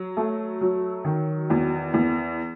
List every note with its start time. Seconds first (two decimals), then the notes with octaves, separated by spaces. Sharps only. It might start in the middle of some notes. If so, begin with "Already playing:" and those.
Already playing: F#3
0.17 A3
0.61 F#3
1.04 D#3
1.50 E2
1.93 E2